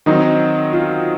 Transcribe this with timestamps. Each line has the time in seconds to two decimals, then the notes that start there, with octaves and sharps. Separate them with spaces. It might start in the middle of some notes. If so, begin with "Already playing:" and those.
0.06 D#3 F#3 C4 D#4
0.73 F4